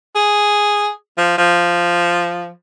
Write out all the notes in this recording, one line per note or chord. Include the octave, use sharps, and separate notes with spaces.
G#4
F3
F3